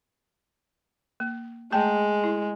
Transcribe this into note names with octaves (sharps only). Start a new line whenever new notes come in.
A#3
G#3 A3 G5 A5
E4